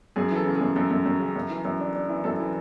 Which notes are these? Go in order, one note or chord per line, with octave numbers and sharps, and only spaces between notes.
F#2 G#4
E3 A4
C#3
G#4
F#2
F#2 A4
F#2
F#2
C#3
F#2
E3
F#2
D4
D4
E3
F#2 A4
E3